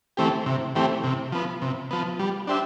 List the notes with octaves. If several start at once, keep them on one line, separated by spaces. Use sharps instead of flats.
E3 A3 C4 G4
C3
E3 A3 C4 G4
C3
F3 B3
C3
F3 B3
G3
D4 G4 C5 E5